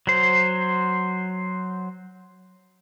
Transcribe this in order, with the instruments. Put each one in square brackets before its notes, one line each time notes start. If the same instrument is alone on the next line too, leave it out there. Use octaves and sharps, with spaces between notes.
[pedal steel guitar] F#3 C5